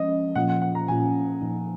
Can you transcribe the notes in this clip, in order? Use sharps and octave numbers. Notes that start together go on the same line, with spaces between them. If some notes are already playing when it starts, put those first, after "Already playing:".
Already playing: F3 G#3 C#4 D#5
A#2 F3 A#3 C#4 F4 F#5
F#5
F#5
A#5
A#2 F3 A#3 C#4 F4 G#5
A#2 F3 A#3 D#4